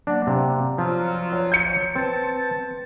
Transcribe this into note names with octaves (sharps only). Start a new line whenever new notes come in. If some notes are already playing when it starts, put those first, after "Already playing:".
F#3 A#3 D4 F#5
C3 D5 F5 A#5
F3 F#3 F4
C#5
G6 C#7
C4 B4 A5